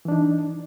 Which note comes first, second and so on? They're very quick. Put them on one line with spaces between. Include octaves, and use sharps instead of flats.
E3 D4 D#4